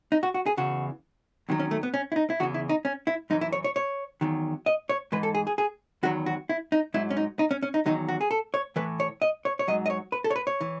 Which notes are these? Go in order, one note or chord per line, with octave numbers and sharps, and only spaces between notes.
D#4
F#4
F#4
G#4
E2 C#3 E3 F#4
E2 D#3 F#3
C#4
A3
B3
C#4
E4
D#4
E4
E2 C#3 E3 F#4
E4
D#4
C#4
E4
F#2 E3 D#4
E4
C#5
C#5
C#5
E2 D#3 F#3
D#5
C#5
G#2 E3 B4
A4
G#4
G#4
G#4
E2 D#3 F#3 F#4
F#4
E4
D#4
G#2 F#3 E4
C#4
D#4
D#4
C#4
C#4
D#4
E2 D#3 F#3 D#4
F#4
G#4
A4
C#5
A2 E3 B4
C#5
D#5
C#5
C#5
G#2 F#3 D#5
D#5
C#5
B4
A4
C#5
B4
C#5
E3